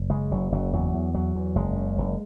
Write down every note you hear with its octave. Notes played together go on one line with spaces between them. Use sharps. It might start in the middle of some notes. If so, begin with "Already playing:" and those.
Already playing: F#1
C#3 G#3
F#1 F#3
F#1 F#3
E2 F#3
E2
E2 F#3
E2
F#1 G#3
C#3
F#1